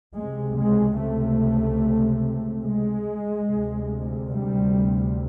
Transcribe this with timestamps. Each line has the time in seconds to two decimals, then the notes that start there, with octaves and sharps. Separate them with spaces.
0.14 C#2 C3 G#3
0.55 G#3
0.97 A3
2.63 G#3
3.46 D2 C3
4.30 G3